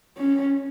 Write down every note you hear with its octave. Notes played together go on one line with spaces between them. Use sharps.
C#4